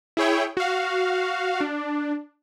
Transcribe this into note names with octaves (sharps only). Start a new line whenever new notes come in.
E4 G#4 C#5 G5
F#4 F5
D4